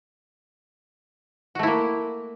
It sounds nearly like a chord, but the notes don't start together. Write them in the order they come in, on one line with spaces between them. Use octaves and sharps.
F#4 A3 E4 A#3